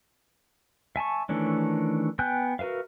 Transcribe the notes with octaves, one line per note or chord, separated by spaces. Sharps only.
E5 G#5 A5 C#6
D#3 E3 A3 C#4 D4
B3 G5 G#5 F#6 G6
F#4 A#4 B4 E5 F5